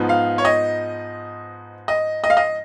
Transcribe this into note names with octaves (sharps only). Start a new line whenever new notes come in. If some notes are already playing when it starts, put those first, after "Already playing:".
Already playing: G#2 F3 B3 D#4
F5
C#5
D#5
D#5
D#5
F5
D#5